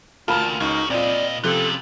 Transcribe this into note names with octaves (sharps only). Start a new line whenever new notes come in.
D2 F4 A#4 A5 B5
C#2 C#4 D#4 F#4
A#2 C4 F4 D5 D#5
C3 F3 C#4 F4 A4 F#6